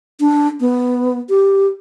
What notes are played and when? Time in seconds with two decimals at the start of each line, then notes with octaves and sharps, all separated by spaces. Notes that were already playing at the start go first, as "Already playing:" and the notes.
0.20 D4
0.60 B3
1.29 G4